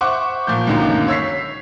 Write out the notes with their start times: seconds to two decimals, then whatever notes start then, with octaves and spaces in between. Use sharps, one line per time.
0.01 C5 E5 F#5 C#6 D6
0.47 A#2 F3 G6
0.67 C#2 F#2 D3 D#3 F#3 A#3
1.08 C#5 E6 B6 C7